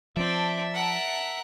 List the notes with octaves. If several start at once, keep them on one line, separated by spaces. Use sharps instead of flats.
F3 C4 D5 E5 A5
A#4 F#5